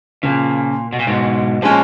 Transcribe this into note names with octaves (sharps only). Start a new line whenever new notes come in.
A#2 C#3 F3 A#3
B2
A#2
G#2 B2
A#2 F3 G#3 C#4